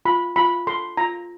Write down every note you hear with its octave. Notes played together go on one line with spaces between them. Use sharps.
F4 B5
F4 B5
A4 C6
F4 A#5